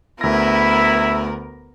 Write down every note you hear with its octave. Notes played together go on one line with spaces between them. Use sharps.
D2 B3 E4 A#4 E5 A#6